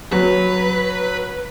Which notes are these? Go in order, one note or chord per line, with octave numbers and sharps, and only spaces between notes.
F#3 B4